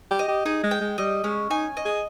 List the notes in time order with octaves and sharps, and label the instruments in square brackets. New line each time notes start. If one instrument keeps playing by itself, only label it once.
[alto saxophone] G4
[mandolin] D#5
[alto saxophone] G4
[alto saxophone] D#4 [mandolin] G#4
[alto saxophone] G#3
[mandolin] G5
[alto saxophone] G#3
[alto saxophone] G3 [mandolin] D#5
[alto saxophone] G#3 [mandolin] C#4
[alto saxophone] D#4 [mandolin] G#5
[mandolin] D#5
[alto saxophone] G#4